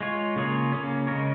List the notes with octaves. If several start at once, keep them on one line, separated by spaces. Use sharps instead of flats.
G#3 F4 C#5
C#3 A#3 F4 G#4 C#5
C#3 A#3 C#4
C#3 G#3 C#4 A#4 C#5